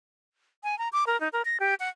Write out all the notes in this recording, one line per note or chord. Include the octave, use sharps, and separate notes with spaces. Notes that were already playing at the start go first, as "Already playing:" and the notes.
G#5
A#5
D6
A#4
D#4
A#4
A#6
G4
F#5